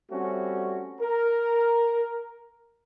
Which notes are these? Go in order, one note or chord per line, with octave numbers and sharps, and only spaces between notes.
G3 A3 C4 C#4 F#4
A#4